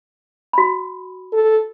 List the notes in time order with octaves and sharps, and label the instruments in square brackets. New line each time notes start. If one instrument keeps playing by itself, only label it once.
[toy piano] F#4 B5
[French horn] A4